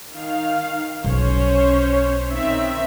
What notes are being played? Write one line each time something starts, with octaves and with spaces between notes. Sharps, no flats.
D#3 F5
B1 C#4 C5 C#5
D#3 C4 E5